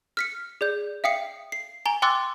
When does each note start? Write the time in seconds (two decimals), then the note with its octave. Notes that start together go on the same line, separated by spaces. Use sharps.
0.17 F6 B6 C#7
0.61 G#4 D5 G6
1.04 E5 F5 G5 D#6 C7 C#7
1.52 C7
1.86 G#5 A#5 F7 G7
2.02 G5 C6 D6 E6 F#6 A6